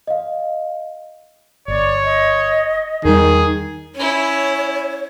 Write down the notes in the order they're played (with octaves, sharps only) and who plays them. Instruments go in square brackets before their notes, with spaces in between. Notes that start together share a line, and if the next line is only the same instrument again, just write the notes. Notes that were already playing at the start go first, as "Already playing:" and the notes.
[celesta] D#5 F5
[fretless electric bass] G1 [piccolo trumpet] C#5 [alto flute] D5
[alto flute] D#5
[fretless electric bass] E2 G3 [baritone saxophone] D#3 [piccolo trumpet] G#4
[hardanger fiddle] C#4 E4 [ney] C#5